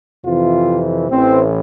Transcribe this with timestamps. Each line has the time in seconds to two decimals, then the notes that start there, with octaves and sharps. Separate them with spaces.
0.25 F2 C3 E3 F4
1.10 A1 A2 E3 C4